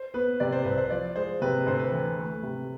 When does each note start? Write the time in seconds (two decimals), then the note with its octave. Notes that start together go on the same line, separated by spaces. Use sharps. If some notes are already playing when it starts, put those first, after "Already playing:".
Already playing: C5
0.14 B3 B4
0.40 C3 D5
0.52 C5
0.65 C2 B4
0.78 C5
0.90 F3 D5
1.16 G#3 C5
1.42 C3 B4
1.66 D2 C5
1.79 B4
1.92 E3
2.18 A3
2.43 C3